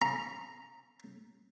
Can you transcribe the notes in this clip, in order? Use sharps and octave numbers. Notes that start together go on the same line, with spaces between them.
A#5